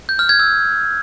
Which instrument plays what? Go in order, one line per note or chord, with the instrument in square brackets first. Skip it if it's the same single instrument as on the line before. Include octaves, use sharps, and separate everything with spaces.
[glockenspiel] G6
F6
G#6
E6